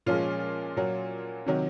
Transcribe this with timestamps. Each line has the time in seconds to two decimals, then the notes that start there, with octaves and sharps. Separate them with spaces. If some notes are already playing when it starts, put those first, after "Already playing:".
0.06 A#2 F3 G#3 C#4 F4
0.77 A#2 F#3
1.46 C3 D#3 F#3